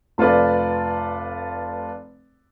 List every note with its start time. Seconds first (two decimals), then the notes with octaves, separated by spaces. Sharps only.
0.18 F1 F4 A4 B4 D5